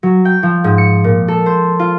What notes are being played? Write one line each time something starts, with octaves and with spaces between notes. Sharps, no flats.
F#3
G5
F3
G#2
C#7
A#2
A4
C5
F4